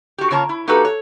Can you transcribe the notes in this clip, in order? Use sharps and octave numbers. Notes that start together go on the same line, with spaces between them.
F#4 G4
C#3 A#3 F4 C#5 A5 A#5
E4
A#3 D#4 F#4 G4 A4 B4
C#5